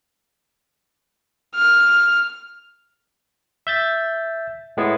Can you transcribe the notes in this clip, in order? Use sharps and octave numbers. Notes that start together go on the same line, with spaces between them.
F6
E5 G6 A6
A2 G#3 B3 E4 G#4